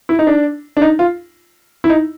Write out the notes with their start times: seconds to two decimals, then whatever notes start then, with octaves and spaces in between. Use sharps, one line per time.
0.09 E4
0.19 D#4
0.27 D4
0.77 D4
0.82 D#4
0.99 F4
1.84 E4
1.90 D#4